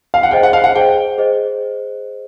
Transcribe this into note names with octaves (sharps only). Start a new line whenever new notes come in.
F5
F#5
G#4 C5 D#5 G5
F#5
F5
F#5
G#4 C5 D#5 G5
G#4 C5 D#5